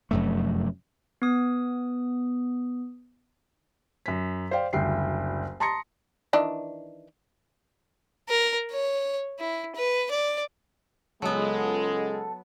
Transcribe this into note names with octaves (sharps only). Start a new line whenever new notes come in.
F1 F#2 A3
B3 D#6
F#2 B6
C5 D5 F5 G5
F#1 D2 G3 G5 C7
A5 A#5 C6 D#6 A#6 C#7
D#3 E3 D4
A#4
C#5
E4
B4
D5
C#2 F#3 G#3 B3 A4